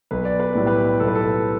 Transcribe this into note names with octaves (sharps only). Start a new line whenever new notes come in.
B1 B4
D5
B4
A2 G3 D5
G4 B4
B1 A4
B4
A4